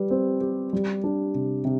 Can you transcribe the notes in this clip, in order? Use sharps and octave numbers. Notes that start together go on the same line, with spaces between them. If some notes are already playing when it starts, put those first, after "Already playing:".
Already playing: G3 B4
C4
G4
G3
D4
C3
C3